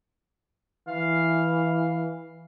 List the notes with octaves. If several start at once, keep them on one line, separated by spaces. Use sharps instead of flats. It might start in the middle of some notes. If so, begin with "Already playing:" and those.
E3 F5